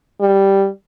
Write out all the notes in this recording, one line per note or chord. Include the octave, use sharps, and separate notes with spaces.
G3